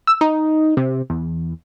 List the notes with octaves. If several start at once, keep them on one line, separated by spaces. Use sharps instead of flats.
E6
D#4
C3
E2